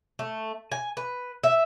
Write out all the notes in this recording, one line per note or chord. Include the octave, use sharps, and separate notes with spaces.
A3
G#5
B4
E5